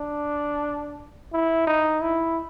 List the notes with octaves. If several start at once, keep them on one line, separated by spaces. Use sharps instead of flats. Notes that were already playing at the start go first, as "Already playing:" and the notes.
Already playing: D4
E4
D#4
E4